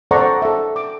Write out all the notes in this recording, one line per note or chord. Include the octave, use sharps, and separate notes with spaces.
A4 C5 D5 F#5 A#5 C#6
A4 E5
D6